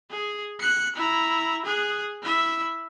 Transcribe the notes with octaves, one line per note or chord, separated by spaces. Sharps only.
G#4
F#6 C#7
E4 A#5
G#4 F#6
E4 E5